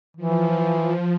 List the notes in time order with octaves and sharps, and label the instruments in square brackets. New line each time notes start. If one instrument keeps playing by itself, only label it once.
[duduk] E3 [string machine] F3